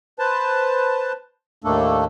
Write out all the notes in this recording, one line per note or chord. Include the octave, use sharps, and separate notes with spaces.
B4 C5 A5
D#2 A2 A3 A#3 D4 A4